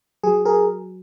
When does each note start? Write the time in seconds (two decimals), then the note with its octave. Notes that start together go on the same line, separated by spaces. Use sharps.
0.23 F#3 G#4
0.45 G#4 A#4